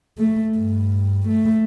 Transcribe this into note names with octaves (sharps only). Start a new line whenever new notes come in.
A3
G2
A3